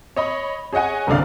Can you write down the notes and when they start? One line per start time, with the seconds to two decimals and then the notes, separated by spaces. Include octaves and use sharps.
0.16 C#5 D#5 B5
0.73 G#4 C#5 D#5 F#5 G#5
1.07 F#1 C2 D3 D4 D5 F5